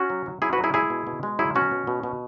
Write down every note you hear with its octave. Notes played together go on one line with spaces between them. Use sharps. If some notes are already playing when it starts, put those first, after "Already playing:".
Already playing: C#4 F#4
F#3
F#3
F#3 E4 G#4
F#4 B4
F#3
E4 G#4
G#3 E4 G#4
B2
B2
G#3
F#3 E4 G#4
B2 C#4 F#4
B2
B2
B2